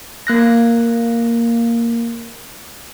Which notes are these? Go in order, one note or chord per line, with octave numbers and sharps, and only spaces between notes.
A#3 F#6 A#6